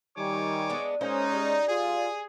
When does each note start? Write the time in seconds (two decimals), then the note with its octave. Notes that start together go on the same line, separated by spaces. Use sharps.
0.17 D#3 G3 C#5 G#5 D6
0.70 G#3 B3 D4
1.01 G#3 A#3 C#4 D#4 C5
1.32 G3
1.68 F4 G#4